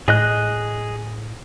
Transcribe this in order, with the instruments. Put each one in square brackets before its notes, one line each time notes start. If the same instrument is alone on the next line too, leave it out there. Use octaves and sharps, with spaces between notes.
[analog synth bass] A2 [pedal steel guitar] G#4 D#5 F#6